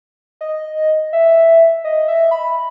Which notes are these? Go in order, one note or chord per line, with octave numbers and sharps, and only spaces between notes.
D#5
E5
D#5
E5
B5